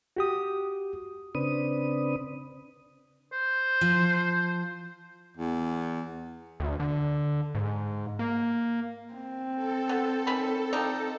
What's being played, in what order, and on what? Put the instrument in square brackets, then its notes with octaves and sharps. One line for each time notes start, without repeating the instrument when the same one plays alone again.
[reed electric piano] F#4 G4 D#6
[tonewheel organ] C#3 C4 D4 B4 D#6
[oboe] C5
[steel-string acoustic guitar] F3
[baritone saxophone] E2
[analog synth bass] D2
D3
G#2
A#3
[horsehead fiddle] C4
[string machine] A4
[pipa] B3
D#3 C#4 B5
F3 G3 D#4